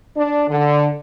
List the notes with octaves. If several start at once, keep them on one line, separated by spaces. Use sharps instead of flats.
D4
D3